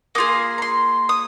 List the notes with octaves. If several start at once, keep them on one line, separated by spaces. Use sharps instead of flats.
A#3 F4 G#4 D#6
A#5
C6
D#6